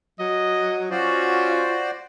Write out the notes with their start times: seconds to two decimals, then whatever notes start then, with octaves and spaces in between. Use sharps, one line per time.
0.20 F#3 D#5
0.91 C#4 F4 F#4 C5 D5